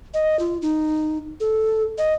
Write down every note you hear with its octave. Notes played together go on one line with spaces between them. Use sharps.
D#5
F4
D#4
A4
D#5